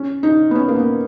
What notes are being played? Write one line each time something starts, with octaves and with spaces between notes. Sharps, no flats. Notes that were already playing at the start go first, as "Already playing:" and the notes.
Already playing: C#4
D#4
B3
C#4
A#3
B3